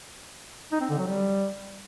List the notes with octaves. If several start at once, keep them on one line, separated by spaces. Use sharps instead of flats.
D#4
C4
D3
F#3
G3